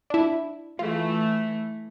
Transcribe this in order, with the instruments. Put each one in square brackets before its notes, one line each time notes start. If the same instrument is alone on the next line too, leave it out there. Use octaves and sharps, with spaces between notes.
[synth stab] D4 E4
[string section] E3 A3 [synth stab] F4